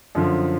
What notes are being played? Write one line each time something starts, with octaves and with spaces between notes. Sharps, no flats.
F#2 D3 F3